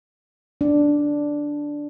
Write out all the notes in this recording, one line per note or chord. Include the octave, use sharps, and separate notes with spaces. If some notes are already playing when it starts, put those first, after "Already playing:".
D4